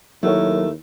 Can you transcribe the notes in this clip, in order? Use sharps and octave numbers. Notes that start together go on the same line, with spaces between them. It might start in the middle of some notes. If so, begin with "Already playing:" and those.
D#2 F#3 A3 E4 A#4 C#5